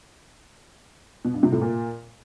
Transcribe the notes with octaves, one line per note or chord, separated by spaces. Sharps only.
B2
G2
C3
A2
A#2